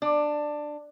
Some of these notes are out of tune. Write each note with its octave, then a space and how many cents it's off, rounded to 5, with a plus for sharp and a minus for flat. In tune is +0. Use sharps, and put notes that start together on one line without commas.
D4 +15